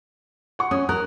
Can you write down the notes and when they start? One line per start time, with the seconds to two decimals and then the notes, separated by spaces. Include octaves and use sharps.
0.59 F#5 C#6
0.71 C#4 D#6
0.89 A#4 F#6